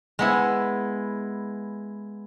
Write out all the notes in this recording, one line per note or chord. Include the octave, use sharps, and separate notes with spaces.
G#3 B3 E4